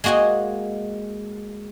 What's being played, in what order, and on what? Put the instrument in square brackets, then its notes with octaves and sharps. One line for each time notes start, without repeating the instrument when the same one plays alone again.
[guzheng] G#3 A#3 F#4 D#5 G#5